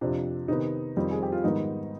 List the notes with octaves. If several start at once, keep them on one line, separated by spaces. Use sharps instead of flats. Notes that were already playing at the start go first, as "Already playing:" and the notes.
F2 C3 F3 D4
C3 D#3 B3 D#4
F2 D#3 G3 C4
G#4
G4
F4
G#2 D#3 G3 B3 D#4